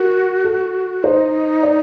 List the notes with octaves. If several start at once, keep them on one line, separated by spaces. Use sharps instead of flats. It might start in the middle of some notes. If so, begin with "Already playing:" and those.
Already playing: F#4 A#4
A4
D#4 C5
D5